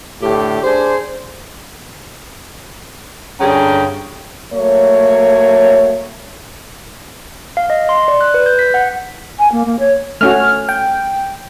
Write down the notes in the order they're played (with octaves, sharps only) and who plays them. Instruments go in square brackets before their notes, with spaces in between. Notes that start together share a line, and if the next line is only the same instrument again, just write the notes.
[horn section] A2 D3 G4
D4 G#4 C5
G2 D3 C#4 G#4 G5 A#5
[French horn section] F#3 A3 A#3 C#5
[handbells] F5
D#5
C6
D5
F#6
B4
G6
B6
F#5
[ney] G#5
A#3
A#3
C#5
[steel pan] A3 C#4 F#4 [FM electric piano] F6
[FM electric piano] G5